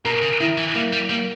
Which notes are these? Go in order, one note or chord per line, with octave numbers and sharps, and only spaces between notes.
B2 A#4
C#3
D#3 E4
E3
G3 A#3
G3
G3 A#3